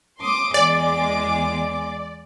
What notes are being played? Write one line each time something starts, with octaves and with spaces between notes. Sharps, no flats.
C6 D6 D#6
E2 G#3 D5 D6